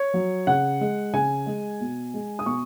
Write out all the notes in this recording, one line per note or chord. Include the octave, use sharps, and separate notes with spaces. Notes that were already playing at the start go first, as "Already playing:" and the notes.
Already playing: C#5
F#3
C#3 F#5
G#3
C#3 G#5
G#3
B2
G#3
D#6
B2 C#6